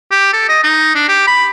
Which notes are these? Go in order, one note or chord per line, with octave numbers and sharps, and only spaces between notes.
G4
A4
D#5
D#4
D4
G4
B5